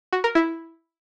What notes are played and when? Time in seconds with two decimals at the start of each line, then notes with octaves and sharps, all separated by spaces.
0.13 F#4
0.24 A#4
0.35 E4